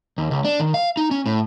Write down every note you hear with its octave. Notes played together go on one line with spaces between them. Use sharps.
D#2
C#2
D4
D#3
F5
D#4
C#4
A2